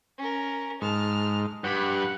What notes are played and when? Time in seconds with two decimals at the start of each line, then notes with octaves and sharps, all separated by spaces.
0.18 C#4 A#4
0.82 G#2 A5 F6
1.64 G2 F#5 B5